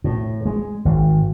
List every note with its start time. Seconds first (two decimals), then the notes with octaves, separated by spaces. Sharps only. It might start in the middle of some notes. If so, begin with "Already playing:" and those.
0.04 A2
0.46 G#3
0.85 G#1